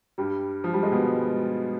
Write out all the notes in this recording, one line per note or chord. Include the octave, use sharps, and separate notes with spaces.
G2 G3
F3
G3
G#3
B2 B3